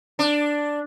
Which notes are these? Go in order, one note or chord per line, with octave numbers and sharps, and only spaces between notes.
D4